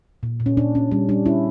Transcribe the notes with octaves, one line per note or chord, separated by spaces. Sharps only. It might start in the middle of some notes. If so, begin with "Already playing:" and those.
A#2
A#2
C#4
A#2 D4
C#4
G3 C#4
G3 D4
C#4 E4